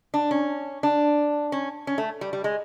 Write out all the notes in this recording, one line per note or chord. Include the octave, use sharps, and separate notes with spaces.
D4
C#4
D4
C#4
C#4
A3
G3
G3
G#3